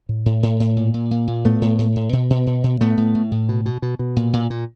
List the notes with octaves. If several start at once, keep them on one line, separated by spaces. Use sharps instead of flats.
A2
A2
A2
A2
A#2
A#2
A#2
A#2
A2 A3 B3
A2
A2
A2
B2
B2
B2
B2
A2 A3 B3
A2
A2
A2
B2
B2
B2
B2
A#2
A#2
A#2